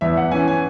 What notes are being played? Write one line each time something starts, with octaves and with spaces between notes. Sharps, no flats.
E2 E5
F#5
E3 C#4 G#5
G#5